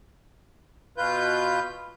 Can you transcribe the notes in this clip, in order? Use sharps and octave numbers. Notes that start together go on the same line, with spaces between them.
B2 F4 B4 G6